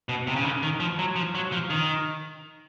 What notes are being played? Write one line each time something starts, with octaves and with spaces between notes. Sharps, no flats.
B2
C3
C#3
D3
D#3
F3
F#3
F3
F#3
F3
D#3